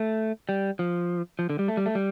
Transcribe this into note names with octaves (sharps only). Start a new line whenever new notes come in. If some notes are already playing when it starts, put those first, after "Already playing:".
Already playing: A3
G3
F3
F3
D3
G3
A3
G3
A3
G3